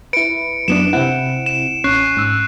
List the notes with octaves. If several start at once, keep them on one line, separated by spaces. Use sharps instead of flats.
E4 B4 C#7 D7
F#2 B3 D4 E7
C3 C4 E4 F#5
E7
A1 C#4 C#6 F#6 C7
G#2 E6